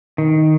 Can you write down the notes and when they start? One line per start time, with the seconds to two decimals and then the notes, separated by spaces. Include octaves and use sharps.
0.18 D#3